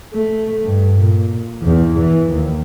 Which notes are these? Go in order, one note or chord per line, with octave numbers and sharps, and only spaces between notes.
A3
G2
A#2
E2
E3
D#2